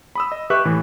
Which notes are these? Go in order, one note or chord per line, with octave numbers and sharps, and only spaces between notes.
B5 D#6 E6
D#5
G4 B4 E5 C#6 F#6
A2 E3